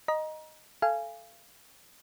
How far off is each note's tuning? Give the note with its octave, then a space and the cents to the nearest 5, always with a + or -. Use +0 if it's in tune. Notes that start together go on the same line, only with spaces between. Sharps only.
D#5 -5 A#5 +25
A4 +0 F5 -25 G#5 +0